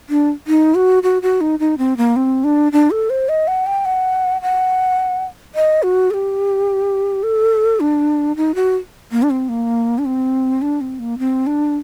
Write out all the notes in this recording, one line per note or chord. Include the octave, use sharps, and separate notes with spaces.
D4
D#4
F#4
F#4
F#4
D#4
D#4
C4
A#3
C4
D4
D4
A4
C5
D#5
F#5
G5
F#5
F#5
D#5
F#4
A4
G4
A4
D4
D#4
F#4
A#3
D4
C4
A#3
D4
C4
D4
C4
A#3
C4
D4